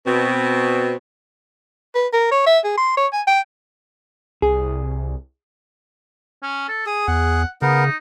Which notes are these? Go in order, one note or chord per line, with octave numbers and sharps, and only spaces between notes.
B2 C4
B4
A#4
C#5
E5
G#4
C6
C#5
G#5
G5
C2 G#4
C#4
A4
G#4 D#6
E2 F#5
C#3 B3 D#4 A#4